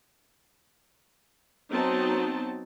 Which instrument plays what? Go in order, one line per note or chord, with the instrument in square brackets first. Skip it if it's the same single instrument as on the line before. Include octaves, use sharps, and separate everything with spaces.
[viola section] F#3 B3 C4 D#4 A5